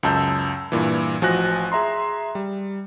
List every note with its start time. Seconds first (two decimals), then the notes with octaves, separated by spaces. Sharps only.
0.03 C#2 F#2 A5 E6 G6
0.72 G2 A#2 E3
1.22 A1 F3 F#4 G#5 F#6 A#6
1.72 G#4 E5 A#5 C6
2.35 G3